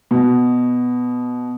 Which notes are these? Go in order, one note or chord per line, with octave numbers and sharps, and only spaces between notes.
B2